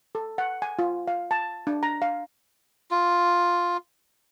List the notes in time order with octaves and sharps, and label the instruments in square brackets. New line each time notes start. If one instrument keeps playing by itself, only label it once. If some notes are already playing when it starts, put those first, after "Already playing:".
[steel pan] A4
F#5
G#5
F4
F5
A5
D4
A#5
F5
[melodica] F4